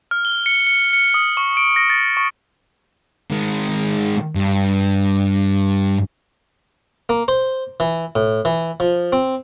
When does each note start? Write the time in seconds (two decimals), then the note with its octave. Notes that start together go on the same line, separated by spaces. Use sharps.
0.11 F6
0.25 G7
0.46 C#7
0.67 C#7
0.93 C#7
1.14 D#6
1.37 C#6
1.57 D7
1.76 A#6
1.90 A6
2.17 C#6
3.31 D#3 G#3
4.35 G2
7.09 A#3
7.28 C5
7.80 E3
8.16 A2
8.45 E3
8.80 F3
9.13 C4